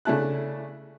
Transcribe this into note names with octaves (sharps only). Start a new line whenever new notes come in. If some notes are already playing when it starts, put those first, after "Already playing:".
C#3 A3 D4 E4 A5 F#6